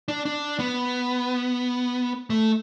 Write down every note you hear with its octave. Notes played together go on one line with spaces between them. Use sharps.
D4
D4
B3
A3